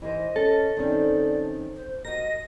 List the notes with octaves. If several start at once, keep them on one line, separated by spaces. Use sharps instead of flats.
E3 A#4 C5 D#5
C#4 A4
D#3 C4 C#4 D5
C5
F#4 A#4 D#5 A#6